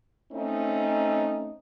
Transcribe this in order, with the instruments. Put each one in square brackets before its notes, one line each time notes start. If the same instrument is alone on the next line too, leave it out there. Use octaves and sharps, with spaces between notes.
[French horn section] A3 C4 C#4 D#4